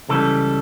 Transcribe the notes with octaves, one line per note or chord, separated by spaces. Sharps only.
C#2 C#3 E3 G3 A4